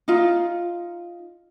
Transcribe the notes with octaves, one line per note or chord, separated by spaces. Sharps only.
D#4 F4